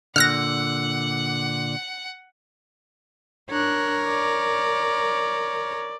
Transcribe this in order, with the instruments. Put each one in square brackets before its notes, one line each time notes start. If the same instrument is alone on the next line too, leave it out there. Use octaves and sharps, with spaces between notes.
[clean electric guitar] A#2 D3 [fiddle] F#5 [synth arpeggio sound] F6 F#6 A#6
[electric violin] D4 F#6 [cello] A#4 C#5
[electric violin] D5